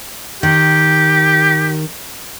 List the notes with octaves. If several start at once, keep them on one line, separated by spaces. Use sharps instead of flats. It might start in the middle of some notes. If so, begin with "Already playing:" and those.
D#3 G4